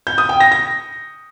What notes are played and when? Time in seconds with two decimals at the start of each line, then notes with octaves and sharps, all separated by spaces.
0.07 G6
0.18 D#6
0.29 G5
0.40 A#6
0.52 A#6